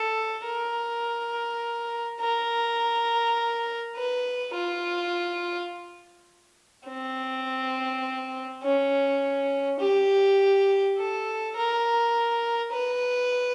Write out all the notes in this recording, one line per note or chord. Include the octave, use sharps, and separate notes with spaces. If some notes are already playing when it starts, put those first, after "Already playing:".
Already playing: A4
A#4
A#4
B4
F4
C4
C#4
G4
A4
A#4
B4